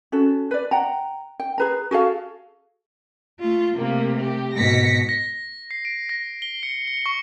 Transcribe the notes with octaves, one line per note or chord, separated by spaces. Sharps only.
C#4 F#4 A4
B4 D5
F#5 G5 A#5
G5
G#4 B4 A#5
F#4 G#4 A4 F5
A3 F4
C3 A3 A#3
G4
G#2 B2 A#6 B6 C#7
A#6
C7
D7
A#6
G7
C#7
C#7
C#6